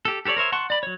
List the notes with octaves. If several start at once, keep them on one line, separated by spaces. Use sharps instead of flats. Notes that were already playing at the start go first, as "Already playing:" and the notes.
G4 A4
G4 A4 A#4 C#5 D5
A#4 C5 C#5 E5
F#5 A5 C6 C#6
D5 B5
F#3 C#5